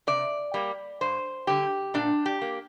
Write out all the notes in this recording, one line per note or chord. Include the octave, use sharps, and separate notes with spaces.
C3 D5
G3 A#3
G2 C5
D3 G3 G4
A#2 D4
G4
A#3